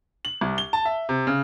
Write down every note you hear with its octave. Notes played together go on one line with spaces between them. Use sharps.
F#7
C2
G7
A5
E5
C3
C#3